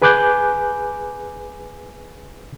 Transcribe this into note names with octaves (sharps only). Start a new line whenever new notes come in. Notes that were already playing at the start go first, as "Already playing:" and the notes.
G#4 B4 G#5 D6 F#6 G6